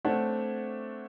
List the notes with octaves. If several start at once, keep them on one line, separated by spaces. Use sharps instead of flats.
A3 C4 D4 C#5 D5 F#5